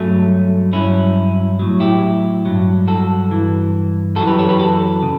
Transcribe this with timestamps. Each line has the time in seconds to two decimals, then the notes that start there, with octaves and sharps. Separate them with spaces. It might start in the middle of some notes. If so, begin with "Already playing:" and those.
Already playing: G2 F#3 A3 C#4
0.73 G2 F#3 C#4 E4
1.59 A2 F#3
1.80 E4 G4
2.45 G2 F#3
2.88 F#4 A4
3.31 G2 E3
4.16 F#2 E3 F#4 A4
4.27 G4 B4
4.39 A4 C#5
4.49 G4 B4
4.59 F#4 A4
5.03 C#3